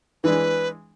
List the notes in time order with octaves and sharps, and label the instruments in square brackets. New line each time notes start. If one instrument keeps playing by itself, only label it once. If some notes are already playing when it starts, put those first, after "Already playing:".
[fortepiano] E3 G#3 D4 [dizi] B4